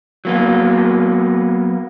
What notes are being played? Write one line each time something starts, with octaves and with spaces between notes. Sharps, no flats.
F#3 A#3 B3